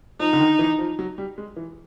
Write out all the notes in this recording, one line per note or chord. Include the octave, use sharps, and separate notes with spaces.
F3 D#4
D3
D#3
E3
F3
F#3
G3
G#3
E3